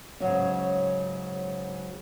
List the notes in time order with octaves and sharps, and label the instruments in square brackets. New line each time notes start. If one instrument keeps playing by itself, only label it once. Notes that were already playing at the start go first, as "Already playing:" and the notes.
[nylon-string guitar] G#2 C#3 F#3 C#4